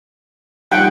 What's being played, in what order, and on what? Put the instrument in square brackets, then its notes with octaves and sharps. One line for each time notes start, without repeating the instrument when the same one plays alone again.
[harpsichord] F3 G3 D#4 [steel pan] F#5 G5 [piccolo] F#6